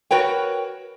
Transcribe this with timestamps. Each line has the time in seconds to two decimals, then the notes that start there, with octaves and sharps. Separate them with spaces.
0.11 F#4 A#4 B4 C#5 G5